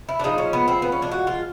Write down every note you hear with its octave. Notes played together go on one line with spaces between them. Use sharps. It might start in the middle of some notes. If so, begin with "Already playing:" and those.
E4
D4
A#2 F3 G#3 D#4
C#4
B3
C4
B3
C#4
D4
F#4
F4